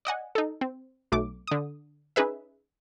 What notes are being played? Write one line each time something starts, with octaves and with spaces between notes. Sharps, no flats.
D5 D#5 F#5 G#5
D#4 A4
C4
B1 F#3 A3 D6
D3 D#6
C#4 D#4 G#4 B4 E5